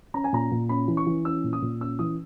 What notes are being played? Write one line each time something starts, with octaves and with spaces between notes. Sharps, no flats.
C#4 A#5
G#5
A#2 A#5
A#2
C#4 B5
E3
C#6
E3
C#4 E6
A#2
D#6
A#2
C#4 E6
E3 D#6